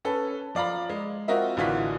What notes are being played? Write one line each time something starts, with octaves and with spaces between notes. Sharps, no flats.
C#4 A4 B4
F3 D5 F5 A#5 B5
G#3
C4 F4 F#4 A#4 D#5 E5
A1 D3 E3 F4 F#4 B6